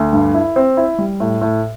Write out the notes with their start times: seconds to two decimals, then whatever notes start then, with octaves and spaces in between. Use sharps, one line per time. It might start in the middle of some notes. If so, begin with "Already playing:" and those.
Already playing: D2
0.13 G2
0.34 E4
0.56 C4
0.77 E4
0.99 G3
1.20 A2
1.41 A2